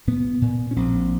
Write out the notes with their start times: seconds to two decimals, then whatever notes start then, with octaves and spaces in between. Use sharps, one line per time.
0.07 A#2 B3
0.42 A#2
0.71 C#4
0.76 A#1 C4